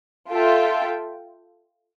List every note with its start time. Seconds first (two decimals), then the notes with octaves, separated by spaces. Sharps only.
0.31 F4 A4 E5 G5